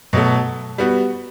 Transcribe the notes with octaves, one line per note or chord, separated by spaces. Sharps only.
B2 F#3 A3
G3 B3 F#4